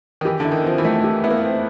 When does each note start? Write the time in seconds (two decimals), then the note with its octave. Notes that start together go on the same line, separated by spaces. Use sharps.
0.21 D#3
0.25 E3 G4
0.40 D3 E4
0.52 D#3
0.65 F3 C4
0.78 E3
0.85 A3
1.04 G4
1.24 B3 E4
1.30 A#3
1.43 C4